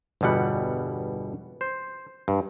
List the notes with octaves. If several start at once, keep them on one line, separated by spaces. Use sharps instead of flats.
G1 E2 B2 G3 F#5
C5
G2